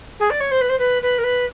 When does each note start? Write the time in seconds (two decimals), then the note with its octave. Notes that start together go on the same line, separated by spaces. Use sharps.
0.19 G#4
0.30 D5
0.40 C#5
0.51 C5
0.61 B4
0.69 C5
0.79 B4
1.02 B4
1.18 A#4
1.23 B4